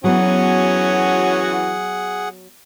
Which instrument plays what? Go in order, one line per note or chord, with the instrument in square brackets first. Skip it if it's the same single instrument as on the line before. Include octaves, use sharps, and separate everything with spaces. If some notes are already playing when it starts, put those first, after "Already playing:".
[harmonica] E3 C#4 F#4 [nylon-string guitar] F#3 B3 [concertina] G#4 F#5